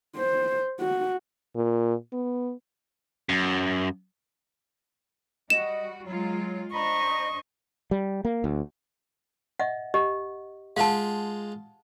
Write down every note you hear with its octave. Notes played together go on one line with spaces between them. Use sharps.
C5
F#4
A#2
B3
F#2
G3 F#4 D#5 E7
F#3 G#3 F4
D4 C5 D#5 A#5 B5 C#6
G3
A#3
D2
D#5 E5 F#5
G4 D#5 F#5
G#3 F4 F5 F#5 A5